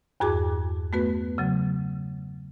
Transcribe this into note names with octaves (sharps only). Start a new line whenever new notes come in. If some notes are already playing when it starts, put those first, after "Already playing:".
E2 G2 F#4 G#4 A5 D6
A3 B3 F#4 B4
C#3 F#3